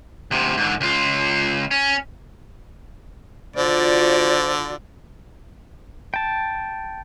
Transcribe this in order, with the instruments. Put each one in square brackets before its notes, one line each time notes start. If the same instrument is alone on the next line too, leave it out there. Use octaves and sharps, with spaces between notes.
[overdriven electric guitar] D2 C3
G#2 D3
C#2 F4
C#4
[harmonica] D3 [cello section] F4 F#4 D5 [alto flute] C5
[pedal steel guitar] G5 A5